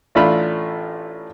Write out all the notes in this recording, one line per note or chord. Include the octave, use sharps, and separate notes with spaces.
A1 A3 D4 F4 A4 B5